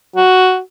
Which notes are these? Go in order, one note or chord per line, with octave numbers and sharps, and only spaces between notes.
F#4